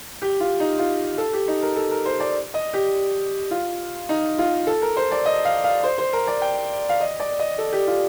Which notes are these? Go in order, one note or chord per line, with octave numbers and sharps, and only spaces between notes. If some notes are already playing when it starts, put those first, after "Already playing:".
G4
F4
D#4
F4
A4
G4
D#4
A#4
A4
A#4
C5
D5
D#5
G4
F4
D#4
F4
A4
A#4
C5
D5
D#5
F5
F5
C5
C5
A#4
D5
G5
F5
D#5
D5
D#5
A4
G4
F4